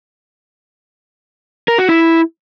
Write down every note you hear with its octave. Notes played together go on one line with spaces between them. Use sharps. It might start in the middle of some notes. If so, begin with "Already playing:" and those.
A#4
F#4
E4